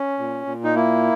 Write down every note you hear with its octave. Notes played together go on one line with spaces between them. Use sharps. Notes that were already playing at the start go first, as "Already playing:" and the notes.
Already playing: C#4
A#2
A#2
D#4
A#3 E4